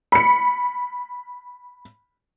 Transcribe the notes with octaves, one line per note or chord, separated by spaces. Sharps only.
B5 C#7